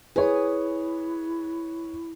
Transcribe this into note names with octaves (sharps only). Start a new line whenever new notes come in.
E4 G#4 B4 C#5